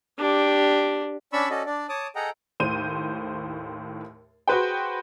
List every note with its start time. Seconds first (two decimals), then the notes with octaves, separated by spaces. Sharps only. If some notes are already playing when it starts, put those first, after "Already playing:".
0.18 D4 G4
1.33 C#4 D4 D5 B5 C#6 E6
1.50 C#4 F#4 A4 D5 D#5
1.66 D4 D5
1.89 C#5 A5 D6 D#6
2.15 G#4 A4 D#5 F#5 G5 A#5
2.60 D#2 A2 C5 D#7
4.48 F#4 G#4 B4 C5 G5